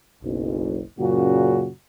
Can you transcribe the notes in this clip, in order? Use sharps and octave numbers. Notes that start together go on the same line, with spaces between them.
F#1 B1
F#2 A#2 C#3 F#4